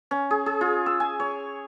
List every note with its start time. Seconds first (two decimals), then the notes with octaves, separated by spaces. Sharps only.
0.11 C#4
0.31 G#4
0.46 G#4
0.61 F4
0.86 E6
1.00 G#5
1.20 C#5